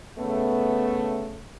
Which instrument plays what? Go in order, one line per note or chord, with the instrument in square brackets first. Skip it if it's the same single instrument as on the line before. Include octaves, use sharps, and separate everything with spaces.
[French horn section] C#3 A3 [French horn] B3